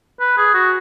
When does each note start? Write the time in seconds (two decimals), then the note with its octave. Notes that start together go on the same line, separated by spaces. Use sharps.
0.20 B4
0.37 G#4
0.54 F#4